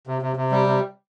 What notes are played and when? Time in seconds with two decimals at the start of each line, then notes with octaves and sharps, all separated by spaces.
0.07 C3
0.22 C3
0.36 C3
0.52 G3
0.67 C3